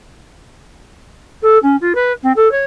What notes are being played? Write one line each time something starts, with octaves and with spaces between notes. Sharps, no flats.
A4
C#4
F4
B4
C4
A4
C#5